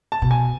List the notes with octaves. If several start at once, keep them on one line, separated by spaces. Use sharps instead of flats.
A5
B2
G#5